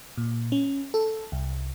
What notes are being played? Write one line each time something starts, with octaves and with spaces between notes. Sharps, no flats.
A#2
C#4
A4
C2